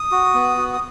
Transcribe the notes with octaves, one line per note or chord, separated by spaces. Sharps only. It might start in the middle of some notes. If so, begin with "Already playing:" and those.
Already playing: D#6
F#4
B3
F#4
D#6